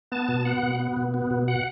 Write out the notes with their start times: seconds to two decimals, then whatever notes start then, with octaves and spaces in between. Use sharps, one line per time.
0.12 B3 A5
0.29 B2
0.45 B3 F#5
0.63 B2
0.80 B3
0.97 B2
1.14 B3
1.31 B2
1.48 F#5